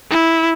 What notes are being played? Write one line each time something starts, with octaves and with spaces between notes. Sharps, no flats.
E4